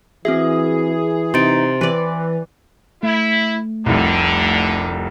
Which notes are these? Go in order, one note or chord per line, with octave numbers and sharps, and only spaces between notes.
E3 C4 F#4 G#4 E5
C3 D#4 C6 A6 D7
E3 B4 D5
A3 E4
F1 C2 D3